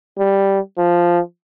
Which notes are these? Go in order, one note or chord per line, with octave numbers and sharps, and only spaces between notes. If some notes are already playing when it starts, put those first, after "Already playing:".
G3
F3